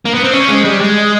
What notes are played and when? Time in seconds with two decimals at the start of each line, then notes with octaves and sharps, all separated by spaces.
0.05 A#3
0.14 B3
0.24 C4
0.33 C#4
0.48 G#3
0.64 G3
0.81 G#3